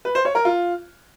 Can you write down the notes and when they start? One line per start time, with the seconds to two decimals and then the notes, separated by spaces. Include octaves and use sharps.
0.05 B4
0.15 C5
0.25 C#5
0.35 A#4
0.45 F4